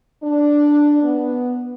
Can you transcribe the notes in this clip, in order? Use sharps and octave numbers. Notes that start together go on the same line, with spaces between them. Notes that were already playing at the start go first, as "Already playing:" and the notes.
D4
B3